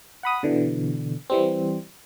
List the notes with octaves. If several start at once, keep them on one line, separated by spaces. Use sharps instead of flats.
F#5 B5 D#6
B2 D3 E3
E3 G3 C4